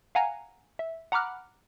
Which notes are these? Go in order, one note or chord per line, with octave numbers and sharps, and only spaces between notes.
F5 F#5 G#5 A#5
E5
F#5 A#5 B5 D6 F6 F#6